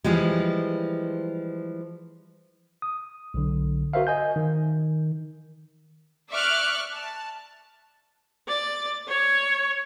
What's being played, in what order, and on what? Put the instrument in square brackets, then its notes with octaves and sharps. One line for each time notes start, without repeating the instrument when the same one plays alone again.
[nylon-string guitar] E3 F3 G3 G#3
[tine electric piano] D#6
B1 D3
F#4 A#4 C5 E5 F5
D#5 G#5 G6
D#3
[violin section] D5 E5 C#6 D6 F6 F#6
A5
[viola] D5
C#5